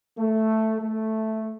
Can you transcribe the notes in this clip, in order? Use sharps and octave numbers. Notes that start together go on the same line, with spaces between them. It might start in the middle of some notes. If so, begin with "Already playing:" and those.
A3
A3